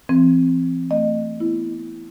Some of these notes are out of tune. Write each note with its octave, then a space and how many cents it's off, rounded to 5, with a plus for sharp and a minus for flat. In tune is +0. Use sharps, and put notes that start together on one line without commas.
E3 +40 C4 +0
A3 +30 D#5 -30
B3 +0 E4 +0